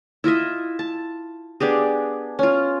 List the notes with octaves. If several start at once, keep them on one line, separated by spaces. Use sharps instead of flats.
E4 F4 D#5 E5
A5
B3 D4 G4 G#4
C#4 F4